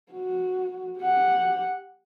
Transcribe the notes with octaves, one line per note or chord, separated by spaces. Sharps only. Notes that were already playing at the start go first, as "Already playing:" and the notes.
F#4
G4 F#5